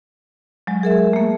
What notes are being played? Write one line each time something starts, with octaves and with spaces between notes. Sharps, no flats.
F#3 G#3
G#4 A#4 E5
A3 A#3